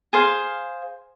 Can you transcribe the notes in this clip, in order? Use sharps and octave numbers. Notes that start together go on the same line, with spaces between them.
G#4 C5 F5